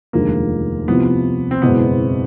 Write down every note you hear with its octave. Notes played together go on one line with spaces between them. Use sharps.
F1 D#2 D3 F3 G#3 A#3
C2 C3 F3 B3
C4
F#1 E2 B2 G#3 B3 C4